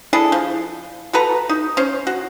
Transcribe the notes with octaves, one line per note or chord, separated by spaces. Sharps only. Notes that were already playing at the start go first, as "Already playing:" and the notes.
D4 E4 G#4 A4
F3
F#4 A4 B4 A#5
D#4
C#4 C5
F#4